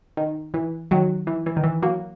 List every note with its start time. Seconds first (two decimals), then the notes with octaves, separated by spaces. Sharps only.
0.17 D#3
0.54 E3
0.91 D#3 F#3
1.27 E3
1.46 E3
1.57 D#3
1.64 E3
1.83 F#3 A#3